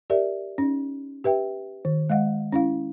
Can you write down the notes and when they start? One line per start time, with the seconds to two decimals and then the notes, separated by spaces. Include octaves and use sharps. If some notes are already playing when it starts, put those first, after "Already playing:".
0.10 G4 A#4 D5 E5
0.58 C#4 D#4
1.24 G4 B4 E5 G5
1.85 D#3
2.10 G#3 D#5 F5 F#5
2.52 C#4 E4 F5